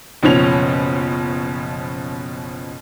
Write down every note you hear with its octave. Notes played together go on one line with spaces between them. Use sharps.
F#1 B2 F3 C#4 F7